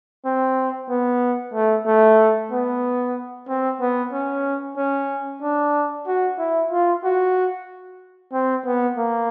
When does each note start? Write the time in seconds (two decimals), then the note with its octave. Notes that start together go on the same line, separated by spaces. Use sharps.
0.25 C4
0.90 B3
1.54 A3
1.86 A3
2.51 B3
3.48 C4
3.80 B3
4.13 C#4
4.77 C#4
5.42 D4
6.07 F#4
6.39 E4
6.71 F4
7.04 F#4
8.33 C4
8.66 B3
8.98 A#3